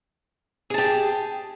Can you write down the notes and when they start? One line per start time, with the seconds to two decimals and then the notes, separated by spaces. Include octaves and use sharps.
0.70 G#4
0.74 A5
0.78 G4